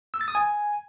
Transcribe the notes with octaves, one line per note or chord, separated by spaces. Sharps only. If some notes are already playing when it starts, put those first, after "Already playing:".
E6
A6
D#6
G#5